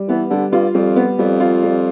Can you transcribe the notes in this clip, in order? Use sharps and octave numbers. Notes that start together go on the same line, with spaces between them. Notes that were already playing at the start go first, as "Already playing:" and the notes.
Already playing: G3
E3 B3
D3 G3
G2 F4
F2 G3
B3
F2 G3
F4
G3